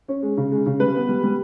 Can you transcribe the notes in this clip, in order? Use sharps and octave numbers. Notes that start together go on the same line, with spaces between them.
C#4
G#3
C#3
G#3
C#3
G3 B4
B3
G3
G3